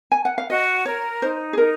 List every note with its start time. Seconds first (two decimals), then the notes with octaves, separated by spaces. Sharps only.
0.12 G#5
0.25 F#5
0.38 F5
0.50 F#4 D#5
0.85 A#4 C#5
1.22 D#4 C5
1.53 G#4
1.58 D#4 A#4